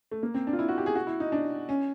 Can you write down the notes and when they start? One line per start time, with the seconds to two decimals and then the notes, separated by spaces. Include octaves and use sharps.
0.12 A3
0.23 A#3
0.34 C4
0.47 D4
0.53 F4
0.59 E4
0.69 F#4
0.78 G4
0.86 G#4
0.95 F#4
1.07 E4
1.20 D#4
1.32 D4
1.69 C#4